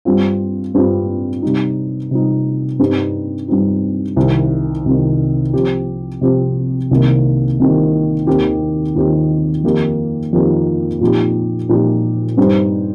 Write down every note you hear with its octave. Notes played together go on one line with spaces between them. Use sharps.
G2 G3 C4 F4
G2 G3 C4 F4
C3 G3 D#4
C3 G3 D#4
G2 G3 C4 D#4
G2 G3 C4 D#4
C2 C3 D#3
C2 C3 D#3
C3 F3 C4 G4
C3 F3 C4 G4
C2 C3 D#3 A#3
C2 C3 D#3 A#3
D#2 D#3 C4 G4
D#2 D#3 C4 G4
F2 D#3 A#3 D#4 G4
F2 D#3 A#3 D#4 G4
A#2 F3 D#4 G4
A#2 F3 D#4 G4
G2 G3 D#4 C5